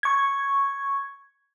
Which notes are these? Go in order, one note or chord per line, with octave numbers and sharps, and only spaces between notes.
C#6 G#6